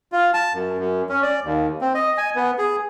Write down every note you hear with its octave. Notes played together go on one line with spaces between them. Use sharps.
F4
A5
F#2
F#2
C#4
D5
D#2
C4
D#5
G#5
B3
G#4